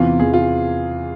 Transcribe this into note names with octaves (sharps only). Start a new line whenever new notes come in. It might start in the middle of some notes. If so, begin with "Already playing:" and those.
Already playing: E2 C3 E3 F4
E2 C3 E3 G#4
F4